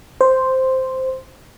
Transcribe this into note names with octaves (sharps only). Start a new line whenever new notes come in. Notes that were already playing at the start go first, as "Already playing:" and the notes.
C5